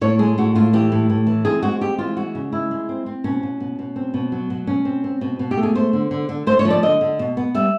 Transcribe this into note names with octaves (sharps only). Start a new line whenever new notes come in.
A2 C#5
G#3 G#4
A2 F#4
A2 F4
E3 G4
A2
A2
E3
C4 G#4
G#3 F#4
C4 G4
E3 F4
G#3 F#4
C#3
G#3 E4
G#3
C4
C4
B2 C#4
B2
B2
B2
C4
B2
F#3
B2
B2 C#4
C4
C4
B2
B2
G4
A3
G#4
A3 C5
D3
D3
D3
A3 C5
C#5
F3
D5
D3 D#5
D3
B2
B3
G3 E5